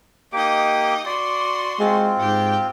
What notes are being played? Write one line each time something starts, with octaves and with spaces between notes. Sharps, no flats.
A#3 D#4 G4 D#5 D6
F#4 D5 C6
G#3 C4 F4
G#2 G4 G5